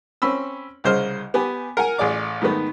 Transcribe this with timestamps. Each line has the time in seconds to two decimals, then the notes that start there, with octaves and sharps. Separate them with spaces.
0.22 C4 C#4 B5 E6
0.84 C2 C#3 C5 D#5 F6
1.34 B3 G4 G#5
1.77 A#4 F#5 G#5
1.98 A1 G#4 D5 D6
2.41 G#2 D#3 A3 B3